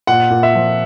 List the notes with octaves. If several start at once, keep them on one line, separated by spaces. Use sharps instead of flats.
A#2 F#5
A#2
E5
F3